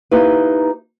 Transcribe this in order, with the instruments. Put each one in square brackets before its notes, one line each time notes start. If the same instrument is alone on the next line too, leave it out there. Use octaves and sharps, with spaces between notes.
[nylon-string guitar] A#3 D#4 E4 G4 B4